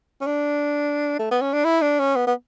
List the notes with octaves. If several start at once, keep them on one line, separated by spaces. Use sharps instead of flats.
C#4
D4
A3
B3
C#4
D4
E4
D4
C#4
B3
B3